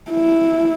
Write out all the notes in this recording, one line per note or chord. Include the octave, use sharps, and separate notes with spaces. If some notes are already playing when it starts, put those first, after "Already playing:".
E4